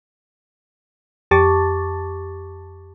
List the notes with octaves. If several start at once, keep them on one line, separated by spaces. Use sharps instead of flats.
F2 G4 A5 C#6 D6 A6